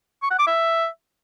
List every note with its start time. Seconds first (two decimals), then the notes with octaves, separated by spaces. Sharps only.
0.23 C#6
0.31 F#5
0.39 D6
0.47 E5